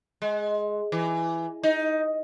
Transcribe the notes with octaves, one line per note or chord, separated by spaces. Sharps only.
G#3
E3
D#4